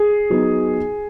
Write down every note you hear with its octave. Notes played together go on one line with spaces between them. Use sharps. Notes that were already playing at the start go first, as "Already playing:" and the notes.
Already playing: G#4
F#3 B3 D#4